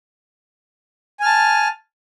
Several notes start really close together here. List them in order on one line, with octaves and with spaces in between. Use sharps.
G#5 F6 A5